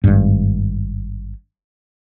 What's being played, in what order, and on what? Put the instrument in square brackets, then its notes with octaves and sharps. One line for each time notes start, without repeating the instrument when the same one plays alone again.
[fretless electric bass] G#1 G2